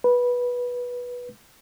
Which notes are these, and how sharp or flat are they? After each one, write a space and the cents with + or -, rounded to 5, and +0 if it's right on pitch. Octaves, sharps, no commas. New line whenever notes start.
B4 -15